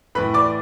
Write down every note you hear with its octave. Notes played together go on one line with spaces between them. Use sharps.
A2 E3 B4 B5
D5 D6